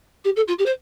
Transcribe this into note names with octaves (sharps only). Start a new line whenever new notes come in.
G4
A4
F4
G4
C5